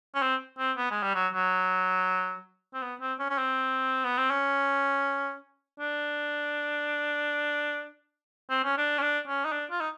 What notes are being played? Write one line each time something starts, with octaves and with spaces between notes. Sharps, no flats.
C#4
C4
C4
B3
G#3
G3
F#3
F#3
C4
B3
C4
C#4
C#4
C4
B3
C4
C#4
D4
C4
C#4
D4
C#4
D4
C#4
D#4
D4
F4
D#4